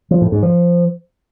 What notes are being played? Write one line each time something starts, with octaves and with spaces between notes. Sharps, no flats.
F3
A2
G#2
F3